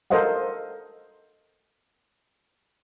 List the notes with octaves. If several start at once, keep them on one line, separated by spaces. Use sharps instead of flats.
A4 A#4 C5 D#5 F5 F#5